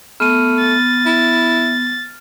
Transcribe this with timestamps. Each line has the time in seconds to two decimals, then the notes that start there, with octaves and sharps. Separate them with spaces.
0.20 A3 B3 F6 D#7
0.60 A6
1.06 E4